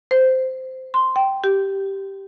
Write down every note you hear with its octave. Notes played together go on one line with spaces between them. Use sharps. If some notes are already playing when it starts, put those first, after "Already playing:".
C5
C6
G5
G4